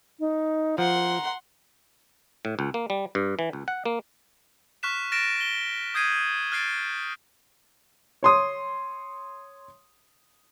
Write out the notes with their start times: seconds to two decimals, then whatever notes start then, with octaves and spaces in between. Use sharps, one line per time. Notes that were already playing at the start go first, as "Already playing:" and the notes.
0.20 D#4
0.78 F3 F#5 A#5 C6
2.45 A2
2.59 C#2
2.74 A#3
2.90 G3
3.15 G2
3.39 E3
3.53 C#2
3.68 F#5
3.85 A#3
4.83 C#6 F6 F#6 B6 E7
5.12 F6 A6 A#6 D7 E7
5.37 A#6 G7
5.94 D#6 G6 G#6 C7 D#7
6.52 F6 F#6 A6 C7 D7
8.23 C#5 C6 D#6